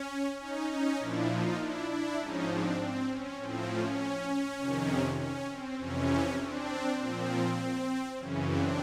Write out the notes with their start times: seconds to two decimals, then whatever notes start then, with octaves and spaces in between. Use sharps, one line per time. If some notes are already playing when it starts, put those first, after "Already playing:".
Already playing: C#4
0.39 C#4 D#4
0.69 C#4 D#4
0.99 A#2 F3 D4 E4
1.29 D#4 F4
1.59 D4 E4
1.89 D4 E4
2.19 G#2 F3 C#4 D#4
2.49 C4 D4
2.79 C4
3.09 C#4
3.39 A2 F3 C4
3.69 C#4
4.59 F2 C3 D#3
5.18 C#4
5.48 C4
5.78 F2 C3 E3 C#4
6.38 C4 D4
6.98 A#2 F3 C4
8.18 F#2 C#3 E3 C#4
8.47 C4 D4